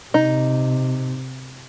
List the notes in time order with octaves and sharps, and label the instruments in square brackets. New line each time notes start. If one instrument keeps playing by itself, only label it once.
[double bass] C3 [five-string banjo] D#4